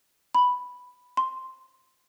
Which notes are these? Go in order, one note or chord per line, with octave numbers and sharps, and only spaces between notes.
B5
C6